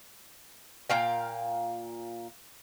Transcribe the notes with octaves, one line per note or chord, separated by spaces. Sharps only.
A#2 F5 G5